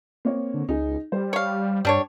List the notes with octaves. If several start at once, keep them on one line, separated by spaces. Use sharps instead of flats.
A#3 C4 C#5
D3
C#2 D#4 G#4
G3 C5
C#5 F5
G2 G3 D4 C#5